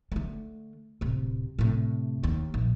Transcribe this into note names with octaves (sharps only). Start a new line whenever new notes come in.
D3 A3
D1 C3
A2 C3
D#2
A#1